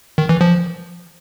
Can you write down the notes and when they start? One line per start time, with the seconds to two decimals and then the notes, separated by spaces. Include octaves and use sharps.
0.18 D#3
0.29 E3
0.41 F3